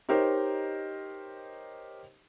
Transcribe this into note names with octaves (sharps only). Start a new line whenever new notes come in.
D#4 G4 A#4 C5 C#5 D#5